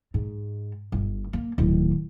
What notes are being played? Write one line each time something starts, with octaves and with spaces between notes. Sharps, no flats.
G#2
G1
A#3
D1 D#3